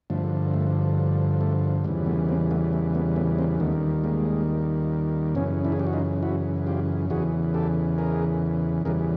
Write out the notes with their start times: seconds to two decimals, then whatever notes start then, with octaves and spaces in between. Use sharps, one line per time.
0.10 G2 D3 F3 A3
0.54 A3
1.41 A3
1.84 E2 C#3 E3 G3 A3
2.06 A3 B3
2.29 A#3 C4
2.51 A3 B3
2.73 A3
2.94 A3 B3
3.16 A3 B3
3.38 A#3 C4
3.60 D#2 D#3 G3 A3 B3
4.04 G#3 A#3
5.35 F#2 C#3 E3 B3 C#4
5.64 D4 E4
5.72 G#4
5.79 G4
5.87 F#4
5.93 D#4 F4
6.23 E4 F#4
6.66 F4 G4
7.10 E2 C#3 E3 F#4 G#4
7.54 G4 A4
7.98 G#4 A#4
8.85 E2 C#3 E3 G3 G#4 A#4